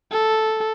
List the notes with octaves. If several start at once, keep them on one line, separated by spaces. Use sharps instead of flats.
A4